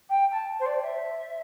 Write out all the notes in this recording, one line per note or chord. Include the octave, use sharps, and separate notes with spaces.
G5
A5
C5
D5
E5